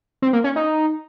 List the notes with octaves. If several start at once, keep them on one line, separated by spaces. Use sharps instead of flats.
C4
A#3
C#4
D#4